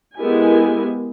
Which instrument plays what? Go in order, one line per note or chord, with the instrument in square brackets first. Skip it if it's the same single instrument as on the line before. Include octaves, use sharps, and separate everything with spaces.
[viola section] G#3 B3 E4 G4 A#4 G#5